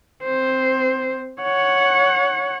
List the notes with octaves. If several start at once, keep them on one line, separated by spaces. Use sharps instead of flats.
C4 C5
C#5 F#5